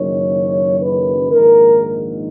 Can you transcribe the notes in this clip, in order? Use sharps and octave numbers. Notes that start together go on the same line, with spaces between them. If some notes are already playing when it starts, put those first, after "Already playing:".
Already playing: F#1 F#2 D#3 C#5
B4
A#1 G#2 D#3 A#4